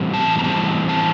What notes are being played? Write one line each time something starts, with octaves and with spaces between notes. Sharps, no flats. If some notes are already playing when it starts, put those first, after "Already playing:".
Already playing: A2 E3 G3 C4
A5
A#5
A2 E3 G3 C4 A5
A5